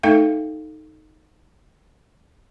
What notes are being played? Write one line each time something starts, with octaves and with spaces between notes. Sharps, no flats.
A3 D#4 A4 E5 F5 G5